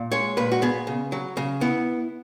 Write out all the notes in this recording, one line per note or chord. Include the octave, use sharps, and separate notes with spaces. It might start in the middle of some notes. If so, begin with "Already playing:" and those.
Already playing: A#2
G#3 C#5
A#2 B4
F#4
B3 G#4
C#3
F#3
C#3
B3 E4